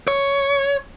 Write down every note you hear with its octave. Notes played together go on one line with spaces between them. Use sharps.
C#5